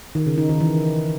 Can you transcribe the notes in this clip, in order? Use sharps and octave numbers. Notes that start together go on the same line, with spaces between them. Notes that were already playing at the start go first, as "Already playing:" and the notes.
D#3
C#3
D#4
D#3
E3